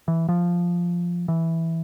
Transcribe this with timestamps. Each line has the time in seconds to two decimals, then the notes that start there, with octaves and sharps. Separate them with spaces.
0.08 E3
0.29 F3
1.28 E3